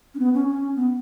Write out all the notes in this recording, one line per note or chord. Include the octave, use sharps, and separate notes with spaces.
C#4
B3
C#4
C#4
B3